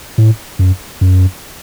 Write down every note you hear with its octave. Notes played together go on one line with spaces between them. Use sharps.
A2
F#2
F#2